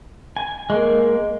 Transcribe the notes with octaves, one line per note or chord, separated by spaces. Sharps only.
G#5
G#3 A#3